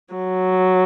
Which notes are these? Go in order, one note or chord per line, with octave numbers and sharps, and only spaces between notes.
F#3